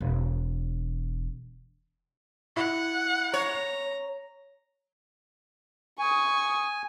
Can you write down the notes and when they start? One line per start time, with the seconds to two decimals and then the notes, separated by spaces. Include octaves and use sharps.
0.01 E1
2.57 E4 F#5
3.34 C#5 A#5
5.99 G#5 C#6 D#6